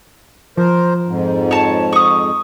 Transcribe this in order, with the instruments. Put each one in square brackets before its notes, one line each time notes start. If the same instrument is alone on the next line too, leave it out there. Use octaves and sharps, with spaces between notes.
[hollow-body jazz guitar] F3 [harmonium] A#4 C5
[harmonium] F2 G#2
[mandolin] C#5 A5
C#6 D#6